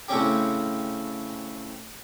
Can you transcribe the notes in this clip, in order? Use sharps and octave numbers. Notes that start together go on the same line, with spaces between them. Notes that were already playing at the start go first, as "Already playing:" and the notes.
A2 C#3 C4 C#4 G4